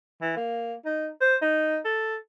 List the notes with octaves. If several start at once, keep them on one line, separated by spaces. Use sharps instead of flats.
E3
A#3
D#4
C5
D#4
A4